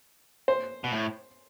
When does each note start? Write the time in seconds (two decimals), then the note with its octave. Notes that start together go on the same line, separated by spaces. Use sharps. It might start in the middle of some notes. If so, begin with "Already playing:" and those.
0.48 C5
0.84 B2
0.92 A2